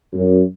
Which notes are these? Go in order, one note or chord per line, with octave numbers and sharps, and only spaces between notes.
F#2